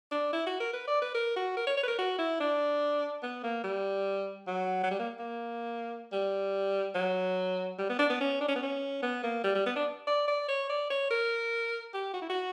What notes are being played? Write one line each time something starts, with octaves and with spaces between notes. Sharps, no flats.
D4
E4
F#4
A#4
B4
D5
B4
A#4
F#4
A#4
C#5
C#5
B4
A#4
F#4
E4
D4
B3
A#3
G3
F#3
F#3
G3
A#3
A#3
G3
F#3
G3
B3
D4
B3
C#4
D4
C#4
B3
C#4
B3
A#3
G3
G3
B3
D4
D5
D5
C#5
D5
C#5
A#4
G4
F#4
E4
F#4